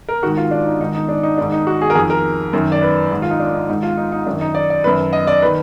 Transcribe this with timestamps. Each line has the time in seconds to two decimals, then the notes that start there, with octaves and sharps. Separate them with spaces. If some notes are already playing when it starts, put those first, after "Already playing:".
0.09 A#4
0.23 D#3 F#4
0.26 G#2
0.37 F4
0.51 D4
0.66 D#4
0.80 G#2 D#3 D#4
0.94 D#4
1.09 D4
1.23 D#4
1.38 G#2 D#3 D4
1.52 D#4
1.67 F#4
1.82 G#4
1.90 A#4
1.95 F2 D#3 G#4
2.10 A#4
2.53 F#2 D#3
2.72 D5
2.82 B4
3.11 G#2 D#3
3.22 F4
3.31 D#4
3.40 D4
3.54 D#4
3.68 G#2 D#3 D#4
3.83 F4
3.97 D#4
4.12 D#4
4.26 F#2 D#3 D4
4.41 D#4
4.55 D5
4.70 D5
4.84 F#2 D#3 B4
5.13 D#5
5.27 D5
5.42 D#3 B4